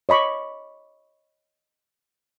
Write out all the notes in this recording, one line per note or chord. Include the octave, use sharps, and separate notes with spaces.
C#5 D#5 B5 C#6 D6